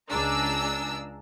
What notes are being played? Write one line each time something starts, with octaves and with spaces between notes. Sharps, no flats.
C#2 D4 G#4 A#5 E6